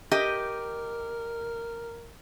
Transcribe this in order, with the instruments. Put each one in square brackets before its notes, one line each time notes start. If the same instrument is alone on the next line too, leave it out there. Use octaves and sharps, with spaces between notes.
[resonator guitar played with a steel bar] G4 D#5 [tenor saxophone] A#4